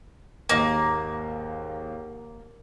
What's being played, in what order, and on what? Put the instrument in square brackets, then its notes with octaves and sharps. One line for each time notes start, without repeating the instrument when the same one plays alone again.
[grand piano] D#2 G#2 D#5 [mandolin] A#3